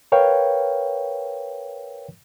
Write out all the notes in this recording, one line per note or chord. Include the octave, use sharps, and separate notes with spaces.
A#4 B4 C#5 F5 G5